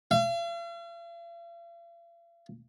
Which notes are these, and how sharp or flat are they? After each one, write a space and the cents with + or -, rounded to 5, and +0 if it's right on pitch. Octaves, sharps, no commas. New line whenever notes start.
F5 -45